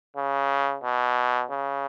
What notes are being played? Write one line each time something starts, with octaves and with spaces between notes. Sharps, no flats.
C#3
B2
C#3